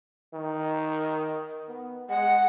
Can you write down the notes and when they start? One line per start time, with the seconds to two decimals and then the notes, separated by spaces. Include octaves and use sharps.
0.34 D#3
1.68 B3
2.09 G#3 F#5